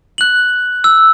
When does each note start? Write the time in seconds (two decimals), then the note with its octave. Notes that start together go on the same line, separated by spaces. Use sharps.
0.18 F#6 F#7
0.84 E6